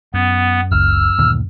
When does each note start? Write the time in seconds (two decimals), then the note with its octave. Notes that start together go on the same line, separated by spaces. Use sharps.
0.14 F#2 B3
0.71 F#1 C#2 E6 F6
1.18 D2 A#2 D#3